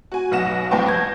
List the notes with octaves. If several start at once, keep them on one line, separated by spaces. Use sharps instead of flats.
F#4 G#5
B1 B2 F#5 A#6 E7
C2 F3 B4 G5 A5 C#6
G6 G#6 A#6